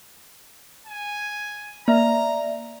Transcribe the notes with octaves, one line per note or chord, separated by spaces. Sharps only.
G#5
A#3 D5 E5 A#5